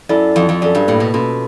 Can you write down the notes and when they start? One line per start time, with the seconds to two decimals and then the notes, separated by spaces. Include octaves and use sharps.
0.09 F#2 E4 A4 D5
0.36 F2 F4
0.49 F2
0.62 F#2 A4 D5
0.75 G2
0.88 A2 A#3
1.00 B2
1.14 B2 C#4 F4 A4